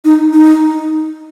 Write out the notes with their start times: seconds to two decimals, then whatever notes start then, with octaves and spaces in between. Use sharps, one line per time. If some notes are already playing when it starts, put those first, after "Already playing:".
0.05 D#4
0.34 D#4